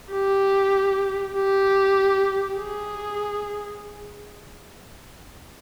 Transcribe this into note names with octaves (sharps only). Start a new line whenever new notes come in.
G4
G4
G#4